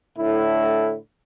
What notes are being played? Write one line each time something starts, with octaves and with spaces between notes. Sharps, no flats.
A2 D3 E4